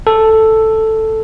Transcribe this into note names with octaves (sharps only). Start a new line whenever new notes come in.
A4